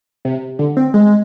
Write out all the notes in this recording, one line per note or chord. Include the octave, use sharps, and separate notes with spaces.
C3
D3
C4
G#3